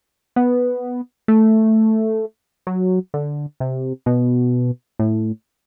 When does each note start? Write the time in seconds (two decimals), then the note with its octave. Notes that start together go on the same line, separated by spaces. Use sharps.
0.36 B3
1.28 A3
2.67 F#3
3.14 D3
3.60 C3
4.06 B2
4.99 A2